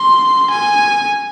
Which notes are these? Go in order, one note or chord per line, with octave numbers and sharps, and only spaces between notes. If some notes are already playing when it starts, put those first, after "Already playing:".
Already playing: C6
G#5